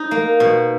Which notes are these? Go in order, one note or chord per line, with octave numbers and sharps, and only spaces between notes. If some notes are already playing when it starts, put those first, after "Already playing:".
Already playing: D#4
A#3
B2